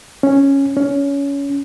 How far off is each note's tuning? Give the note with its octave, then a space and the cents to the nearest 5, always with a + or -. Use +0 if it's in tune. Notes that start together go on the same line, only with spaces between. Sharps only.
C#4 -5
C#4 +20